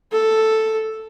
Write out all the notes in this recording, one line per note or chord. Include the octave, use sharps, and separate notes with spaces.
A4